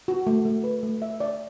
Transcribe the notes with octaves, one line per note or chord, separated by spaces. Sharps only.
F#4
A3
A3
B4
A3
E5
D5